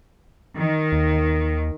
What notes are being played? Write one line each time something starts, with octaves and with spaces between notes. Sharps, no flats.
D#3
D#2